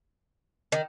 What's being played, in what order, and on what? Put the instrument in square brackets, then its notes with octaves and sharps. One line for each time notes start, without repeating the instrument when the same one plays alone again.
[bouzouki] D#3